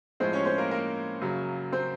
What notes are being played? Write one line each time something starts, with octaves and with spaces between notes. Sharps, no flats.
A2 F3 G#3 C4 C5
C#4 C#5
C4 C5
A#3 A#4
A#3 A#4
F#2 C#3 F#3
C4 C5